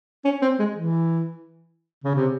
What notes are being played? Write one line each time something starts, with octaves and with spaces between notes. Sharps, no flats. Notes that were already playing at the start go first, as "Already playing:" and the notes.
C#4
C4
G#3
E3
C#3
C3